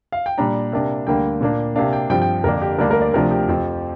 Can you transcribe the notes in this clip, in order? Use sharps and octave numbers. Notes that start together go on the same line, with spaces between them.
F5
G5
A#2 G3 D4 A#5
C3 A#3 D4
D2 D3 G3 A#3 G5
A#2 A#3 D4
C3 A#3 D4 F5
G5
G2 F3 C4 G5
G5
F2 D3 A#3 D4 A#4
G4
D2 D3 G3 A#3 D4 A#4
A#4
D5
D2 C3 F3 D4 A#4
G4
F2 F3 C4